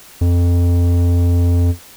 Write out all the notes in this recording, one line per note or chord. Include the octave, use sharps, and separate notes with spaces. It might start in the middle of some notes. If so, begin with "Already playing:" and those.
F2